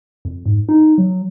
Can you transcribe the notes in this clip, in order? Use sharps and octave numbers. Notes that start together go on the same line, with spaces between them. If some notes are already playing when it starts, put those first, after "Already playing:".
F2
G#2
D#4
F#3